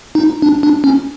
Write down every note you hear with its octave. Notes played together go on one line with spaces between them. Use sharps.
D#4
D4
D4
C#4